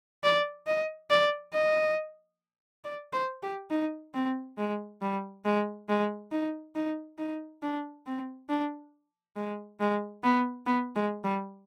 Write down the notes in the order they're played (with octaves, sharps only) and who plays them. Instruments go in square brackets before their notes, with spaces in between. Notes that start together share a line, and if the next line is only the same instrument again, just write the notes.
[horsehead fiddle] D5
D#5
D5
D#5
D5
C5
G4
D#4
C4
G#3
G3
G#3
G#3
D#4
D#4
D#4
D4
C4
D4
G#3
G#3
B3
B3
G#3
G3